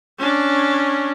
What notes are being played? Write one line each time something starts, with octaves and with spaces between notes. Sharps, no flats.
C#4 D4